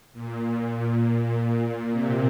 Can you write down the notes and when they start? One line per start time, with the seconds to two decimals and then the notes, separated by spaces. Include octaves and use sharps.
0.13 A#2
0.48 A#2
1.20 A#2
1.91 C3